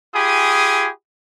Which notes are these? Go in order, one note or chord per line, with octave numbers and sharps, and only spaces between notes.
F4 G4 G#4 G#5 B5 D#6